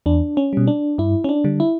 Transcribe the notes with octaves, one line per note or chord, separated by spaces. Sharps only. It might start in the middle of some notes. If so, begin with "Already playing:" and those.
E2 D4
C#4
B2 G3
D4
G2 E4
C#4
D4
D3 G3
E4